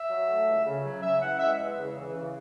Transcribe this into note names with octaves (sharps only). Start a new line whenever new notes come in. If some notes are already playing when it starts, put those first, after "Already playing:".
Already playing: E5
F#3
A3
C#2
C#3
F#3
C#3 E5
E3 F#5
G#3 E5
E2
C#3
E3
C#3